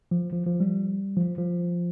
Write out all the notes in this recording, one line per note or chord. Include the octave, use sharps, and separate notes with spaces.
F3
F3
F3
G3
F3
F3